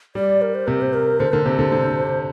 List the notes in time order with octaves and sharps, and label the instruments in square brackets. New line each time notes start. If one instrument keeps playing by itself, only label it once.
[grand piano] G3 [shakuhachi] D5
[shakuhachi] A#4
C5
[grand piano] C3 [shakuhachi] A#4
[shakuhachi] C5
A#4
[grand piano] D3 [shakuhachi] C5
[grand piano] D3 [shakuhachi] A#4
[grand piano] C3 [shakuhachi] C5
[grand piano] D3
D3